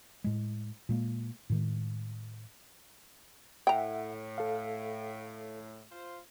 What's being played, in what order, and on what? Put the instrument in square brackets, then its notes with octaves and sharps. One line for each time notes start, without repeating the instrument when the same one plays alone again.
[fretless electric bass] A2 G#3
A#2 G#3 A#3
A2 D#3 G#3
[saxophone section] A2 [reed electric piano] E5 F#5 [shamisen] G5 A#5
[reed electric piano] A4 F5
[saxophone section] F4 C5